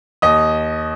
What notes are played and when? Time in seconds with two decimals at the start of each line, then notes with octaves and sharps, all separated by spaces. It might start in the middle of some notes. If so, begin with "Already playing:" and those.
0.22 D#2 D#5 D#6